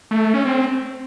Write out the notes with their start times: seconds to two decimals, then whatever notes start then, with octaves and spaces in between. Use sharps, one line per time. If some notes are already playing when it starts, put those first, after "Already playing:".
0.11 A3
0.22 A3
0.34 C#4
0.45 C4